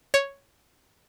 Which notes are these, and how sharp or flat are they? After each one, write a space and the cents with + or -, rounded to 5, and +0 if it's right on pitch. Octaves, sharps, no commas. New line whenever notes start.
C#5 +0 C#6 +5